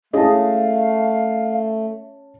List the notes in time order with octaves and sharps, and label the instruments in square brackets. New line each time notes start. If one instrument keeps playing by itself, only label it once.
[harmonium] A3 [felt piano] C#4 A5 [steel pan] E4 G#4 D#5 [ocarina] F5